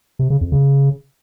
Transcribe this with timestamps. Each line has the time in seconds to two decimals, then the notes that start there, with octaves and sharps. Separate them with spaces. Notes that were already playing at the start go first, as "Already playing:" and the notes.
0.19 C3
0.30 C#3
0.41 F2
0.52 C#3